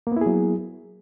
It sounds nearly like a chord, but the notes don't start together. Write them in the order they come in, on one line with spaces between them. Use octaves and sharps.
A#3 B3 E4 G#4 F#3